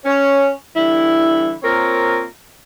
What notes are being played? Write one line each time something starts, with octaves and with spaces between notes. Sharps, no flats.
C#4
D3 E3 G3 E4
A#3 C4 F4 A#4 C#5